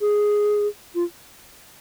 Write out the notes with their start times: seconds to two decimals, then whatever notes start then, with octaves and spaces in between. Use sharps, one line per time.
0.01 G#4
0.95 F4